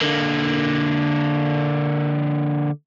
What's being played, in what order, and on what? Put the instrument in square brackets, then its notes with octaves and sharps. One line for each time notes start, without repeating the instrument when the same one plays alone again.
[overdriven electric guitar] D3 A#3